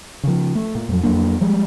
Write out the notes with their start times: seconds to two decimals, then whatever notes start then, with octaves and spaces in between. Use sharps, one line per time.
0.24 C#3 F3
0.55 A3
0.75 A#2
0.89 F2 F#3
1.03 F2 F#3 A#3 D4
1.41 F3 G3 G#3